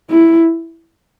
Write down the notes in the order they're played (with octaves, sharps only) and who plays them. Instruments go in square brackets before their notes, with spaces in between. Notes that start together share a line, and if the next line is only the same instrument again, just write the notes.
[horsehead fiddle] E4